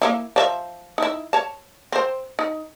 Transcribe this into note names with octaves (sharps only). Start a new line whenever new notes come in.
A#3 D#4 E4
F3 C#5 E5
D#4 E4
C#5 A5
C4 C5
D#4